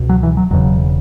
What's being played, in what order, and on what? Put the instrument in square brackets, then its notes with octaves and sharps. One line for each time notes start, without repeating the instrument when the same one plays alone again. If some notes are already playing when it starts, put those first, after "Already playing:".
Already playing: [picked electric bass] C#2 B2
F#3
E3
F#3
E1 E2 C#3 F#3